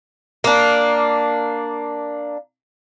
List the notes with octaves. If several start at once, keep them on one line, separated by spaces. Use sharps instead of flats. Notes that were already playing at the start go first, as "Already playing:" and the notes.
A#3 D4